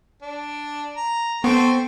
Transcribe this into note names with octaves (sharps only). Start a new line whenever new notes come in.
D4
A#5
A3 B3 C4 C#6